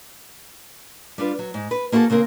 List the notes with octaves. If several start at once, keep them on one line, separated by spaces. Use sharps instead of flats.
G3 D4 F4 B4
F#3
G#2
B4
A#3 E4 F#4 G#4 A4
C#3 A#3 C4 A#4